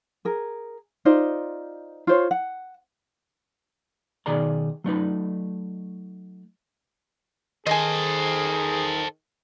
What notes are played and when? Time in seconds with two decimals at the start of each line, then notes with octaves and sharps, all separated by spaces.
0.25 G#4 A#4
1.05 D#4 F4 C5 D5
2.07 F4 C5 C#5
2.31 F#5
4.26 B2 D#3 G#4 D5 A#5
4.84 F#3 A3 D#4 B4
7.67 D#3 G#4 A4 C5 D#5 G#5